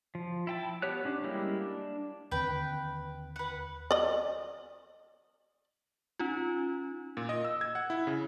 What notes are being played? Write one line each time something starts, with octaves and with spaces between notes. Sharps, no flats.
F3
E4 G5 A5
B3 G4 C#5 F#6
C#4 D4
G3 G#3 A#3 E4 G4
D4
D#2 D3 C4 B4 G5
B4 F#5
D5 D#5
C#4 D#4 F4
A#2
D#5
E6
G#6
F#5
E4
C#3